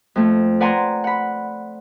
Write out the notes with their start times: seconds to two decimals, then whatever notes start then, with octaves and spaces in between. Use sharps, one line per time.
0.16 F2 A3
0.60 B4 D5 F#5 G#5 A#5 C6
1.04 F#5 B5